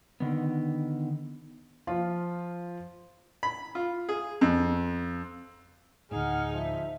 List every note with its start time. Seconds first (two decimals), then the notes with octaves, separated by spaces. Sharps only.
0.20 D3 D#3 B3
1.87 F3 F4
3.43 B5
3.75 F4
4.09 G#4
4.41 F2
6.11 D2 A2 D#4 G#4 F#5 F6
6.53 F3 E5